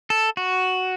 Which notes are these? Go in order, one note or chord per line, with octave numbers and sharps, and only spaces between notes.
A4
F#4